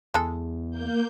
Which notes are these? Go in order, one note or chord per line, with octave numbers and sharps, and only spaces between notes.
E2 G#3 A4
A#3 G6